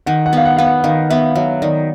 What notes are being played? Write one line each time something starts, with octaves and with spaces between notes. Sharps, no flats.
D#3 F#5
F#5
B3 F5
F#5
B3 F5
F#5
D#3 F5
B3 E5
F#3 E5
D#3 D5